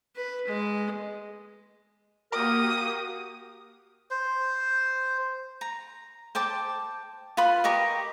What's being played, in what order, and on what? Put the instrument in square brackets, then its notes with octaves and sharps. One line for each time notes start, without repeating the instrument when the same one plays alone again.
[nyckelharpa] B4
G#3
[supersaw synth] A#3 F#4 G4 [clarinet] A#4 [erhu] D#6
[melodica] C5
[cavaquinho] A#5
C5 G5 A5 D6
F4 B4 B5 C6
G4 A#4 D#5 C#6